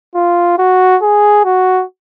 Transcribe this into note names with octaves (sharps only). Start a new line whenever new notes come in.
F4
F#4
G#4
F#4